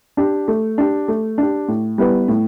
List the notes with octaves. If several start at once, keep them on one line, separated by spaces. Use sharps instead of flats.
D4 G4
A3
D4 G4
A3
D4 G4
A2
G3 B3 E4 B4
A2